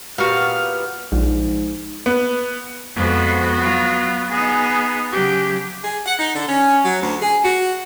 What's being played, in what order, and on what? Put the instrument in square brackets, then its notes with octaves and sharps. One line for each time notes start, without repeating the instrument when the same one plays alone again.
[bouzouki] A#2 G3 B3 [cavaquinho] F#4 F5 [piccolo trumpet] F6
[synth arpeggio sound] A#1 [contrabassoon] G#2
[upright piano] B3
[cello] F2 G#3 [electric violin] B3 F#4
[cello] F#3 F4
[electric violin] B3 [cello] D#4 G#4
[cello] C#3 F#3 [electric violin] G4
[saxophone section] G#4
F#5
D#4
D3
C#4
F#3
D2
G#4
F#4